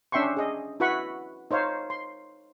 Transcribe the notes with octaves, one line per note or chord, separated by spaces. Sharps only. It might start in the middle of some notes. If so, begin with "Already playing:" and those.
C#4 D4 E5 G5 C6 C#6
G#4 D#5
E4 F#4 B4 F#5 B5 C#6
D#4 C5 C#5 F5
C6